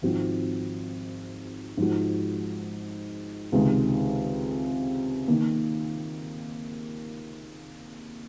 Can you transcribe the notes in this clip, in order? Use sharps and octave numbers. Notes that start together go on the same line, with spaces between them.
G#1 G#2 F3 C4 F#4
G#2 F3 G#3 D#4 F#4
C#2 C3 D#3 G#3
D#3 A#3